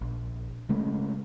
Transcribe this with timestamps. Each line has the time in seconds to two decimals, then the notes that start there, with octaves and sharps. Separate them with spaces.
0.01 A#1
0.69 C#3 G#3 A3 C#4